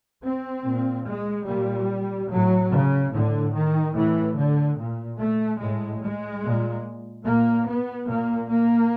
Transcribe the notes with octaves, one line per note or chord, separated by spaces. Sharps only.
C4
A#2
G#3
A#2 G3
A2 F#3
C#3
A2 D3
D#3
A2 E3
D3
A#2
A3
A2 G#3
G#3
A#2
A#2 A#3
B3
A#2 A#3
A#3